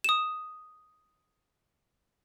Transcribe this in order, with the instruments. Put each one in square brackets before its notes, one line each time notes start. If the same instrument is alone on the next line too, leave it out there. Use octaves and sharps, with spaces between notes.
[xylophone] D#6 E7